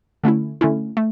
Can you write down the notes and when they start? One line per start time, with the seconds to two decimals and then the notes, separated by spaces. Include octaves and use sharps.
0.23 D3 A3 C#4 E4
0.61 D3 A3 C#4 E4
0.97 A3